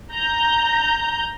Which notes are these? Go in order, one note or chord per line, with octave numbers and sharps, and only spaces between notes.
A#5 G6